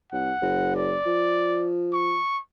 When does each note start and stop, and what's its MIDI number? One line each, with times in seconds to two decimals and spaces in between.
0.12 0.32 36
0.12 0.72 78
0.41 0.97 30
0.76 1.69 74
1.06 2.17 53
1.93 2.40 85